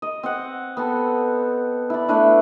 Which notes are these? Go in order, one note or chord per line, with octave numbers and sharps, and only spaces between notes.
D#5
C4 D#5 F#5
B3 C4 A4
E4 D5
A3 D4 E4 B4